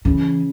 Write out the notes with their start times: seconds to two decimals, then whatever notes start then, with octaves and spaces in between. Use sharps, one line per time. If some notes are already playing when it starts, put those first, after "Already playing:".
0.05 C#3 E3